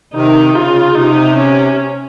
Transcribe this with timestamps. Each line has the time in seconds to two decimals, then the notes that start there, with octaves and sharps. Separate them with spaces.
0.14 C3 D#3 D#4
0.54 C#3 F4
0.95 C3 D#4
1.36 C#4